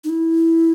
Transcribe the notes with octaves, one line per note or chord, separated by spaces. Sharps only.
D#4
E4